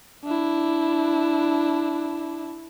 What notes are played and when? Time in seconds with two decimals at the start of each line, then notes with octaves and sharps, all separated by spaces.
0.24 D4 E4